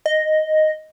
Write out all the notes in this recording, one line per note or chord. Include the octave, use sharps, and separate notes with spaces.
D#5